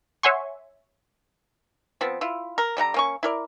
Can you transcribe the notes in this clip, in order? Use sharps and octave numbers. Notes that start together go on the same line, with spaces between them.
C#5 E5 F#5 G#5 C6 C#6
F3 B3 C4
E4 F4
A#4
D3 G3 F#5 A#5
A#3 C#4 C#6
E4 A#4 D5